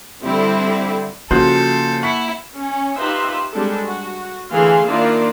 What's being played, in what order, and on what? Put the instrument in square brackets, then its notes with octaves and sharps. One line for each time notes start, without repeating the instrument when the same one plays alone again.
[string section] D3 G3 C4 E4
[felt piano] C#3 F3 C5 [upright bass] A#3 [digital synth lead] F#4 [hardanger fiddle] A4
[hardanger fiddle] E4 [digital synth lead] F#5 [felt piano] C#6 B6 C#7
[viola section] C#4
D#4 F4 G4 B4 C5 E5
G3 G#3 C4 D4 G4 A4
F#4
D3 E3 A3 G#4 F5 C6
D#3 A#3 D4 E4 F4 D5